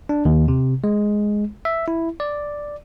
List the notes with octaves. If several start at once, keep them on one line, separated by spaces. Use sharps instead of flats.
D4
D#2
C3
G#3
E5
E4
D5